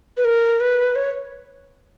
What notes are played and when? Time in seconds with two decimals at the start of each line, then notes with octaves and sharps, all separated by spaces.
0.17 B4
0.25 A#4
0.60 B4
0.96 C#5